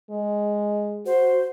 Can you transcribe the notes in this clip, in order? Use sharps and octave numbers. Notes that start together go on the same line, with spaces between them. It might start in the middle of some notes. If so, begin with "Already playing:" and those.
G#3
F#4 C5